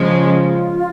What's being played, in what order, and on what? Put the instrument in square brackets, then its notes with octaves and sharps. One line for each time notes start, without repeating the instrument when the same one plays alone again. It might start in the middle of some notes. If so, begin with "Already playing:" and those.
Already playing: [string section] C#3 F3 G#3
[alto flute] F4